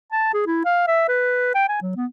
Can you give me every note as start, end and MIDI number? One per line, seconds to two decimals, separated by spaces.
0.12 0.32 81
0.34 0.42 68
0.47 0.62 64
0.65 0.84 77
0.87 1.06 76
1.08 1.50 71
1.55 1.66 79
1.69 1.77 80
1.82 1.94 54
1.96 2.06 59